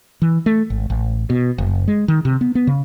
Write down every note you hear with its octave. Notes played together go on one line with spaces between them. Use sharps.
E3
A3
G#1
A1
B2
F#1
G#3
D#3
C3
B3
B3
C#3